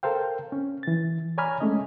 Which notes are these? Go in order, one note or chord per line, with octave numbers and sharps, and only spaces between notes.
A4 A#4 C5 F5 G5
C#4
E3 A6
C#5 D5 G#5 A#5 B5 F6
G#3 A3 C#4 D#5